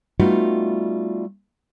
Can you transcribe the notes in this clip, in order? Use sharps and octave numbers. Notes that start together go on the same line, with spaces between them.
G3 A3 B3 D#4 F4 F#4